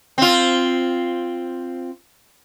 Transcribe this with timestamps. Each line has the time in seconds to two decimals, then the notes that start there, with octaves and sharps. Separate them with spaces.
0.18 C4 F4